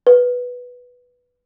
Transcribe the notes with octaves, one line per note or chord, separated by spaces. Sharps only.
B4